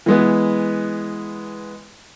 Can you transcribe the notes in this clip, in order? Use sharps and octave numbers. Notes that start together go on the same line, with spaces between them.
E3 G#3 B3